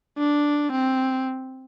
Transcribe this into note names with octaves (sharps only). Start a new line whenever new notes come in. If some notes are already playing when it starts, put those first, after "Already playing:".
D4
C4